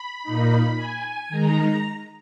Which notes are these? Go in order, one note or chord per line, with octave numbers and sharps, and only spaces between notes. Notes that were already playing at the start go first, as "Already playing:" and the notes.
Already playing: B5
A#2 A#3 D#4
G#5
D#3 G#3 D#4 A#5